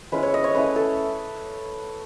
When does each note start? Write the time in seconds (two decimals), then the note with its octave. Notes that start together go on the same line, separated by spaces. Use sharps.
0.12 G#3 C#4 E4 B4
0.23 C#5
0.34 D#5
0.44 C#5
0.54 A3 C#4 E4 B4
0.76 A4